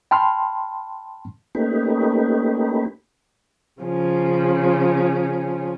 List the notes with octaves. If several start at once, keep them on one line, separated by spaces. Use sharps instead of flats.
G5 A5 B5 C6 F6
A3 A#3 C#4 D#4 G4 B4
C#3 F3 C#4